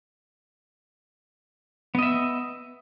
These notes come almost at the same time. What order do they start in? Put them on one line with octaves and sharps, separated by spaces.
B3 D#5 E5